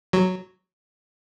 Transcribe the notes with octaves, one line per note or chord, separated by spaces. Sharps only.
F#3